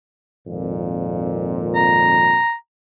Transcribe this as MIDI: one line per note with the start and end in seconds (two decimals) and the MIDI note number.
0.46 2.40 32
0.46 2.40 41
0.46 2.40 46
1.76 2.54 82